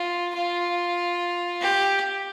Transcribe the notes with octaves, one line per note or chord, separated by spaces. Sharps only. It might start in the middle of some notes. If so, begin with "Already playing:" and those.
Already playing: F4
F4
G4